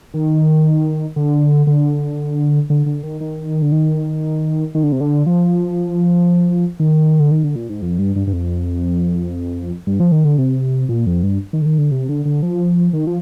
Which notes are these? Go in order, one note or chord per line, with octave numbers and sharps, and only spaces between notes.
D#3
D3
D3
D3
D3
D#3
D#3
D3
D#3
D#3
D3
C3
D3
F3
D#3
D3
D#3
D3
A#2
G#2
F2
G2
G2
G2
F2
G2
F3
D#3
D3
C3
A#2
F2
G2
D#3
D3
D#3
D3
C3
D3
D3
F3
D#3
F3